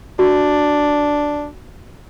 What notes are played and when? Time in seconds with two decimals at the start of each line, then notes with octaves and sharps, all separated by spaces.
0.19 D4 F#4